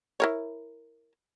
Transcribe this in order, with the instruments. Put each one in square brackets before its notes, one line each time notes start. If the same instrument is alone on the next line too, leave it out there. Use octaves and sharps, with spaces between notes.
[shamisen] E4 A#4 C#5